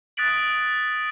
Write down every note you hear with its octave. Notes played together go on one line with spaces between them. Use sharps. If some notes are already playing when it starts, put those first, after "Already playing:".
D#6 F#6 A6 B6 D7 F#7